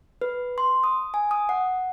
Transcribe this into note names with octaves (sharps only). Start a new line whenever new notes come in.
B4
C6
D#6
G#5
D#6
F#5